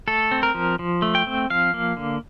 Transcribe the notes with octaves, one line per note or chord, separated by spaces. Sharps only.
A3 A4
C4
A#4
F3
F3
A3
G5
C4
F3 F5
A#3
D3